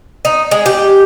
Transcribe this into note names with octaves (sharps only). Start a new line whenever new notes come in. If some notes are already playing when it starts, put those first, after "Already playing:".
D#4
G#3
G4